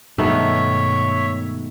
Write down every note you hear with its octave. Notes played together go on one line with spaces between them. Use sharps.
G2 B2 D#3 G#3 A3 B3 C#5 E5